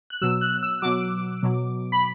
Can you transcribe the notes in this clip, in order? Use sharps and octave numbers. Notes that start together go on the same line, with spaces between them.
F#6
B2 F#3 E6
F#6
E6
B2 F#3 D6
B2 F#3
B5